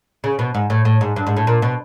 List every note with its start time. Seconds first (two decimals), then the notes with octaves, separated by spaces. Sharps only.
0.24 C#3
0.39 B2
0.55 G#2
0.70 A2
0.85 A2
1.01 G#2
1.16 G2
1.27 G#2
1.37 A2
1.47 A#2
1.62 B2